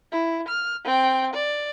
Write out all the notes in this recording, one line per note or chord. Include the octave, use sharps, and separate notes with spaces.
E4
F6
C4 G5
D5